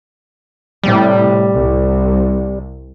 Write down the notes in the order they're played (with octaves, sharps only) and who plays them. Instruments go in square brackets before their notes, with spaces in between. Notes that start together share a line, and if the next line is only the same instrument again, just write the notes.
[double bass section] A2 C3 [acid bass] G3
[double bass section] C2